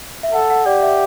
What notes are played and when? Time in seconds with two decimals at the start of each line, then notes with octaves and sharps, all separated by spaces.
0.23 E5
0.33 A4 F#5
0.50 F#5
0.66 G4 D5
0.82 E5